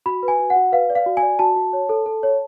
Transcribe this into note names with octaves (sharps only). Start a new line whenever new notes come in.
F#4 B5
B4
G#5
F#4
F#5
F#4
B4 F5
D5
F5
F#4
G#5
D5
F#4 A5
F#4
C#5
A4
A4
C#5